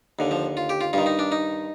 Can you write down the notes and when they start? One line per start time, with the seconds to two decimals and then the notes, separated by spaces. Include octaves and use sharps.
0.19 D#2 D3
0.31 F3
0.57 F4
0.69 G4
0.81 F4
0.93 G2 D#3 F4
1.06 D#4
1.19 D4
1.32 D#4